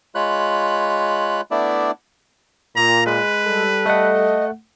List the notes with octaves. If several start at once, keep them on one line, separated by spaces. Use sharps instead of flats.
G#3 F4 C#5 B5 F#6
A3 B3 D4 E4 D5
A#2 A#5
G#3 B4
G3 A4
A3 D#5 F#5